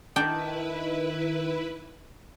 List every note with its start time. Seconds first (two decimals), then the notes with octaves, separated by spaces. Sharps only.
0.16 D#3 D4 E4 B4 G5